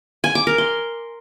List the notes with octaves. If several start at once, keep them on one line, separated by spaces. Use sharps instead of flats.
G#5
D6
A#4
C6